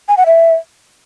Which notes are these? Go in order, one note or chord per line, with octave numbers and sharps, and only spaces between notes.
G#5
F#5
E5